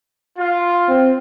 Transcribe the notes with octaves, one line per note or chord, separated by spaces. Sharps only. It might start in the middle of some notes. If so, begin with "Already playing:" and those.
F4
C4